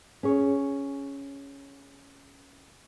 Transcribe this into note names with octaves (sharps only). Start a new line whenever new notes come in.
C#4 G#4 C#5